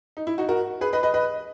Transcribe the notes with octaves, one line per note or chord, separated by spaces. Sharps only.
D#4
E4
D#4 F#4
F#4 A#4
G#4 B4
B4 D#5
B4 D#5
B4 D#5